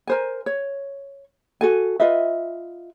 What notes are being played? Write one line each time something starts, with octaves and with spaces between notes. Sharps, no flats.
A#4 C5 G#5
C#5
F#4 A4 G#5
F4 B4 D#5 E5